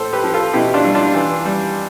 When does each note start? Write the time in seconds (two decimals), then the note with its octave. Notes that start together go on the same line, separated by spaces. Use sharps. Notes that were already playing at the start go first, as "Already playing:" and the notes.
Already playing: A2 A4 C5
0.13 G4 B4
0.23 F3
0.34 F4 A4
0.53 B2 E4 G4
0.74 D4 F4
0.84 G3
0.95 D4 F4
1.14 E3
1.45 G3